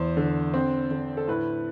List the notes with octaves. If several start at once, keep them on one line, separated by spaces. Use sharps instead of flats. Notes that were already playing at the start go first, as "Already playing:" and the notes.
Already playing: E2 C5
D3
C4
D3
A4
A2 B4